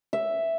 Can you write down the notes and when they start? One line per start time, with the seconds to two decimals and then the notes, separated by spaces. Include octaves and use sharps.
0.13 E5